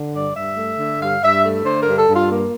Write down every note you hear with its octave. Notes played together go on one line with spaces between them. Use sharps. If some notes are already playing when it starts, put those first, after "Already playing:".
Already playing: D3
G2 D5
G2 E5
A3
D3
G2 F5
G2 E5
A3
D3 C5
A#4
G2
A4
G2
F4
A#3